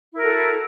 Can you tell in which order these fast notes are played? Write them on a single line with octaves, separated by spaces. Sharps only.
E4 A#4 F#4 A4